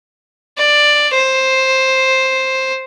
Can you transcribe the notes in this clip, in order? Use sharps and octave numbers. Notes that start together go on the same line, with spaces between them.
D5
C5